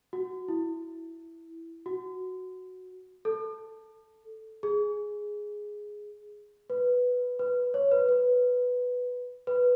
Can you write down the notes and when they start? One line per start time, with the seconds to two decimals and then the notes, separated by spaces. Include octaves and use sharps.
0.13 F#4
0.48 E4
1.86 F#4
3.25 A4
4.63 G#4
6.70 B4
7.39 B4
7.74 C#5
7.91 B4
8.09 B4
9.47 B4